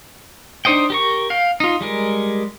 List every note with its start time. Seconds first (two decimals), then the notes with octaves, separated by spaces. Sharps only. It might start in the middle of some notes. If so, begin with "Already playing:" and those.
0.65 D4 D#4 C5 D#5 G5
0.90 G4 A#4 C#6
1.30 F5 G5
1.60 D#4 F4
1.81 G3 G#3 A#4